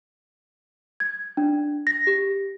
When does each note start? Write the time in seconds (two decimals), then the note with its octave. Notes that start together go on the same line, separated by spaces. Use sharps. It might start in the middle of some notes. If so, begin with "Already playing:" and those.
1.00 G#6
1.37 D4
1.87 A#6
2.07 G4